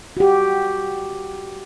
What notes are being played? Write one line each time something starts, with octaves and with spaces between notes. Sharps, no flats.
F#4 G4